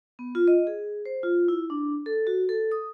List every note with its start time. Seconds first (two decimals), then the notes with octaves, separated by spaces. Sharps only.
0.19 B3
0.35 F4
0.48 D#5
0.67 G#4
1.06 C5
1.23 F4
1.48 E4
1.70 D4
2.06 A4
2.27 F#4
2.49 A4
2.72 D#6